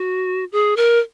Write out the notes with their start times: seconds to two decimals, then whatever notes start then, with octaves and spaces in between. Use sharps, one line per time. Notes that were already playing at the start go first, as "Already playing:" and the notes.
Already playing: F#4
0.52 G#4
0.77 A#4